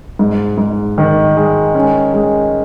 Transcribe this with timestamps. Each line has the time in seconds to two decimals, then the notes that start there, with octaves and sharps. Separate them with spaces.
0.19 G#2
0.58 G#2
0.98 D#3
1.37 G#3
1.75 C#4
2.14 G#3